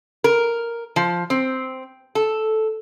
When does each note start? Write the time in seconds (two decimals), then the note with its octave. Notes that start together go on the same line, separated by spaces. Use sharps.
0.24 A#4
0.96 F3
1.30 C4
2.15 A4